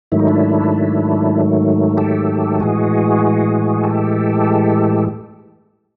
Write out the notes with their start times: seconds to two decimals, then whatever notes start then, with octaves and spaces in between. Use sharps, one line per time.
0.12 G#2 D#3 F#3 A3 E4
0.20 D#4
0.27 D4 E4
1.97 G4 A4
2.60 A2 E3 G#3 F#4 G#4
3.84 G4 A4